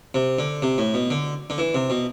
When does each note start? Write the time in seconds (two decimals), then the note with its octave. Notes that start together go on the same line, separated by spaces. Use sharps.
0.15 C3
0.39 D3
0.62 C3
0.78 A2
0.94 B2
1.11 D3
1.50 D3
1.58 E3
1.74 C3
1.90 B2